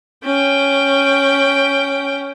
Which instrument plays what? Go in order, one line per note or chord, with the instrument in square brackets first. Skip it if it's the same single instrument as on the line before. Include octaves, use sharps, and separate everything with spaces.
[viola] C#4 G5